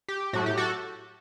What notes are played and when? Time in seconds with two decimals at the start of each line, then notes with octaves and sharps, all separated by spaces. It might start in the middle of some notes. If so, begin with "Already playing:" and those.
0.08 G4
0.33 A2 F#3 A3 F#4
0.46 G4
0.57 F#4 A4